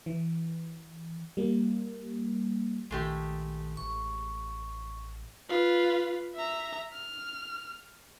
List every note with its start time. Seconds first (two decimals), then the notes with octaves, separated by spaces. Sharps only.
0.06 E3
1.37 G3 A#3
2.91 A#1 D#3 G#3 A3 G4
3.77 A1 C#6
5.49 F4 B4
6.35 E5 A#5
6.93 F6